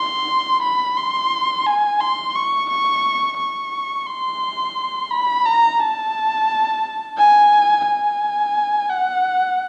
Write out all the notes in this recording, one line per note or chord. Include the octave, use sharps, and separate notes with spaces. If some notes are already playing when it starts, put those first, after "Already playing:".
Already playing: C6
B5
C6
G#5
C6
C#6
C#6
C#6
C6
B5
A#5
A5
G#5
G#5
F#5